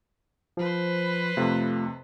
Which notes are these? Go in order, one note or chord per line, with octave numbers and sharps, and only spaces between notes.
F3 B4 C5
F2 C3 A3 F4